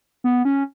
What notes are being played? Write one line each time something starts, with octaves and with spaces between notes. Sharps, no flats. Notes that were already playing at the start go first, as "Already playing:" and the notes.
B3
C#4